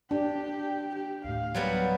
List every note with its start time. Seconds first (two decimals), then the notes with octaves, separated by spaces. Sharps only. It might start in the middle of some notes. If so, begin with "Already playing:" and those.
0.11 D4 G4
0.94 G4
1.25 D2 A2 F5
1.55 F#3 G3 B3